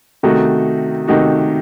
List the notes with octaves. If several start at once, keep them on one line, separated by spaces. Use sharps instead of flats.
C3 D#3 A3 D#4 F#4
C3 D#3 A3 D#4 F#4